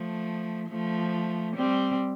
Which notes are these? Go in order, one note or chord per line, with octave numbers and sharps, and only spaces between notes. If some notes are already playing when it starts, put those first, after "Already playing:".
Already playing: F3 A3
F3 A3
G3 C4